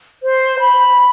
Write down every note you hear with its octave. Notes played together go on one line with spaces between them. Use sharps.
C5
B5